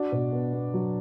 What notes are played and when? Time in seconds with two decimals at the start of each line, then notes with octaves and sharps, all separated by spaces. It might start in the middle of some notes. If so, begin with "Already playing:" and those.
Already playing: D4 F#4
0.12 B2
0.33 B3
0.53 B3
0.74 F#3